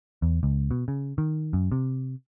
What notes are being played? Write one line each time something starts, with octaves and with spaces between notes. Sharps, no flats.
E2
C#2
B2
C#3
D#3
F#2
C3